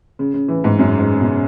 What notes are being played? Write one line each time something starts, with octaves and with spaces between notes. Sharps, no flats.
C#3
C#3
E3
G#2
F#2
G#2
C#3
B2